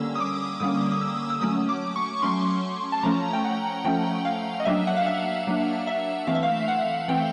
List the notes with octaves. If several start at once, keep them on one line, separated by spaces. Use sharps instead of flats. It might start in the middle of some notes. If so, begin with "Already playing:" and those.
Already playing: D3 G3 A#3 C#4 E6
D#6
D6
D3 G3 A#3 C#4 D#6
D#6
E6
E6
F#3 A3 C#4 D#6
D6
C#6
F#3 A3 C#4 C6
A5
F3 A3 C#4 A#5
G5
F#5
F3 A3 C#4 G5
F5
D#5
F#3 A#3 D4 E5
F#5
F5
E5
F#3 A#3 D4
E5
E3 A3 C4 F5
E5
F5
F#5
E3 A3 C4 G5